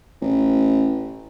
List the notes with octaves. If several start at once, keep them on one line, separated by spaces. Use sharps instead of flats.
A1